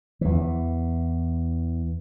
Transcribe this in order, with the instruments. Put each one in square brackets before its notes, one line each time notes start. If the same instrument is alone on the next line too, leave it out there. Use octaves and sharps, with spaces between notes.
[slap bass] E2 E3